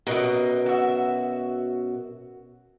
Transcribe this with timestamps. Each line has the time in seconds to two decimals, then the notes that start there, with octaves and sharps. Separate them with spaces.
0.07 F#2 B2 A#4 D#5
0.66 F#4 E5